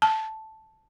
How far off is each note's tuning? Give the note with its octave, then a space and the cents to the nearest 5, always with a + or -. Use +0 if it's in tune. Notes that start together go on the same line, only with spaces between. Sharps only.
A5 -5